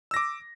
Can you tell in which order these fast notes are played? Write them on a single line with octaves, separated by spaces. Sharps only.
E6 A#6 D6